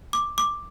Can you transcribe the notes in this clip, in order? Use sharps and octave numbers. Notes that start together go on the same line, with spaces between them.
D6
D6